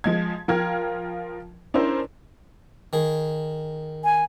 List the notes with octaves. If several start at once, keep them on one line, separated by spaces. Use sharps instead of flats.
F3 G#3 G#6
F3 F4 A#4 G5 F6 G#6
C#4 D4 E4 A#4 C5
D#3 G#4
G#5